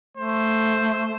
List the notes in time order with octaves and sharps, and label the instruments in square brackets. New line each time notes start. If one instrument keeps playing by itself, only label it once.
[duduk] A3 [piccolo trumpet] C5